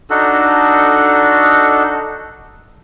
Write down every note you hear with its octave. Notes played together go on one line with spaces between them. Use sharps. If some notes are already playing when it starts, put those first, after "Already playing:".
D4 D#4 F#4 A4